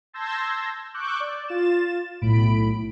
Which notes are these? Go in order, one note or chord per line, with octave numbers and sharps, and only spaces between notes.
A5 C6 E6 G6 G#6 A#6
C#6 D6 E6 F#6 G6
D5
F4 A6 E7
B1 A2 B5 D7